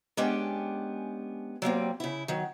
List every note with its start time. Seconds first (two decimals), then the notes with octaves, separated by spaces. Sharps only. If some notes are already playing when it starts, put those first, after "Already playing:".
0.17 G#3 B3 C#4 D4 G4
1.62 F#3 G3 A#3 C4
2.00 C#3 E4
2.28 D#3 F#3